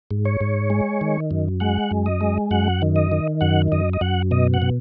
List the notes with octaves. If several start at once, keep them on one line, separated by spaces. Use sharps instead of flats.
G#2
C#5
G#2
G#3
D#3
F#2
G#3 F#5
F#2
D#5
G#3
F#2 F#5
D#3
D#5
D#3
F#2 F#5
F#2 D#5
D#5
F#2 F#5
B2 D#5
F#5
B2